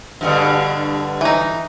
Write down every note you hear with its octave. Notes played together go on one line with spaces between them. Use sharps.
G2 B2 D3
E3 D#4